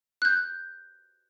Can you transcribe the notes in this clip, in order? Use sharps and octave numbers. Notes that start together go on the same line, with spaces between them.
F#6 G6